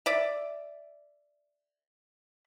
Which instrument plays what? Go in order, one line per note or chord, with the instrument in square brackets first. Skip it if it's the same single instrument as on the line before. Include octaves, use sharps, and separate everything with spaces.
[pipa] D5 E5